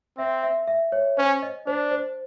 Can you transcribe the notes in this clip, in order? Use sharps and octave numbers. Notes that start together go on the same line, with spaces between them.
C4 E5
E5
E5
C#5
C#4 C5
D#5
D4 C5
C5